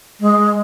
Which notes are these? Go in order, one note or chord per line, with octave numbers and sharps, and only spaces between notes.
G#3